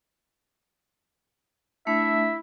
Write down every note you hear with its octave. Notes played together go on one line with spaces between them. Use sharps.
A3 D4 E4 E5